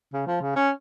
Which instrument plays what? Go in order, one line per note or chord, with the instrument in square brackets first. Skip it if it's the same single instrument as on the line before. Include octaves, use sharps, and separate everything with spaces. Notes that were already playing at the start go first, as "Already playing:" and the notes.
[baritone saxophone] C#3
F3
C#3
C#4